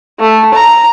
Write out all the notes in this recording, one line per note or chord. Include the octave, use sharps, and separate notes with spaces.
A3
A#5